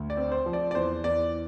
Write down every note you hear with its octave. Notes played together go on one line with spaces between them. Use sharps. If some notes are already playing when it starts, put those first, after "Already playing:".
Already playing: D2
D5
C4
C5
F3
D5
D5
E2 C5
E2 D5